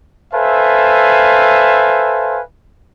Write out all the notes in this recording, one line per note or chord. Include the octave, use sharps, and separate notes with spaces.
A4 B4 C5 E5 F5 G#5